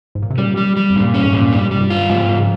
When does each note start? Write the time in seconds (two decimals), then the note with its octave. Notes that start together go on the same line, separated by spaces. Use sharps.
0.15 G#2
0.22 A#2
0.30 C3
0.38 A#2 C#3 G3
0.57 G3
0.77 G3
0.90 F2
0.96 G2 A#2
1.14 C#4
1.23 F2 G#2
1.33 A#2
1.52 G2 G3
1.71 C3 G3
1.81 G2 A#2
1.90 F4
2.09 G#2 F3 G#3
2.29 G#2
2.37 C#3 F3